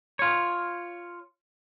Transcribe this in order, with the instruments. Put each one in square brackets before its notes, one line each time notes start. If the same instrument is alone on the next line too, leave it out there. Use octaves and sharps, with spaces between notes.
[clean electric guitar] F4 C#5